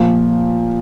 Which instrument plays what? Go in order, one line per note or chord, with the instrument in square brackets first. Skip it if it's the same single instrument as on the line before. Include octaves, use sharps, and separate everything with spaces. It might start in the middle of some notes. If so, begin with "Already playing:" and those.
Already playing: [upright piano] A#2 F3